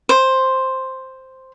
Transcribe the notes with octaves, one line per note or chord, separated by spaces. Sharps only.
C5